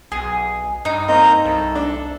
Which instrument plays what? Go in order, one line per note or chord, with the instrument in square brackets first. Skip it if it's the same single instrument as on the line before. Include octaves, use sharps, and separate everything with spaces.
[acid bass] B1 [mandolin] G#4
[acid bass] G2 [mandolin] D#4
[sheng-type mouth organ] A#3 A#5 G6 [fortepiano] C4 D#5
[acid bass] C2 [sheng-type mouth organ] A4
[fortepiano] D4